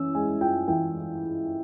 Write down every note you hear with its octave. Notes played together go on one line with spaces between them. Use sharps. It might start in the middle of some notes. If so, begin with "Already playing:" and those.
Already playing: E3 C#4 E6
G#3 G#5
F4 G5
E3 G5